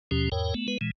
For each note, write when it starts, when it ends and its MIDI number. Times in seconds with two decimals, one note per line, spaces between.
0.11 0.29 39
0.11 0.29 47
0.11 0.29 53
0.11 0.29 61
0.11 0.29 67
0.32 0.54 40
0.32 0.54 44
0.32 0.54 70
0.32 0.54 73
0.32 0.54 79
0.54 0.67 57
0.54 0.67 59
0.68 0.78 56
0.68 0.78 59
0.68 0.78 71
0.81 0.91 46
0.81 0.91 52
0.81 0.91 56